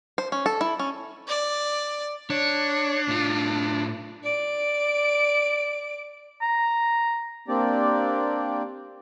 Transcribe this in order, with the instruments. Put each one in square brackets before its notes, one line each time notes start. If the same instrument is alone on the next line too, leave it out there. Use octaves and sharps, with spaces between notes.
[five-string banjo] C5
C#4
A4
E4
C#4
[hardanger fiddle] D5
[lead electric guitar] D4 [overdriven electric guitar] C#5
[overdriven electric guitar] A2 F4
[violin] D5 D7
[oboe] A#5
[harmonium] A#3 C4 D4 G4 D5